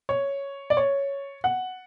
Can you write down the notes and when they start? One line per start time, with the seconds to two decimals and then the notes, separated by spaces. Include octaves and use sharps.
0.09 C#5
0.70 D5
0.77 C#5
1.44 F#5